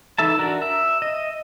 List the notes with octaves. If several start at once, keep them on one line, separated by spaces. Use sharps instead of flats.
E3 D#4 A4 E5 A5
D4 F#4 A#4
E5
D#5